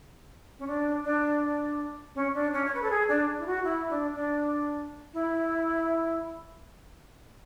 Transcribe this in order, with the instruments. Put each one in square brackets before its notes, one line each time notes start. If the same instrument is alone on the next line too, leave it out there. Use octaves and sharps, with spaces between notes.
[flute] C#4
D4
D4
C#4
D4
C#4
C#5
B4
A4
G#4
D4
E4
F#4
E4
D4
D4
E4